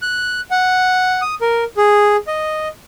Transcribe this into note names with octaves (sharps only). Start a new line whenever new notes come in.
F#6
F#5
D#6
A#4
G#4
D#5